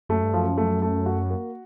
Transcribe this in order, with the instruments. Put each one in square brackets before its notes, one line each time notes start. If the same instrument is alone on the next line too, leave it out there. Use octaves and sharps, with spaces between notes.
[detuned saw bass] F#2 [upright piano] A3
[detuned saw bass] G2
[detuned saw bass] F#2 [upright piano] F3
[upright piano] A3
A3
F#4
A#3